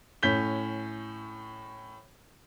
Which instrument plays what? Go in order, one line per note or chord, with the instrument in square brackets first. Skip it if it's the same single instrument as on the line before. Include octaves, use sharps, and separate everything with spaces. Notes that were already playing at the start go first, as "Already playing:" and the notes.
[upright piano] A2 C#4 G6 B6 G7